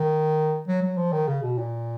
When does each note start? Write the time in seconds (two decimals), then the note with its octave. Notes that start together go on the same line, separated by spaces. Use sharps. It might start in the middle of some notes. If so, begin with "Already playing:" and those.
Already playing: D#3
0.68 F#3
0.82 F#3
0.98 F3
1.13 D#3
1.28 C#3
1.43 B2
1.58 A#2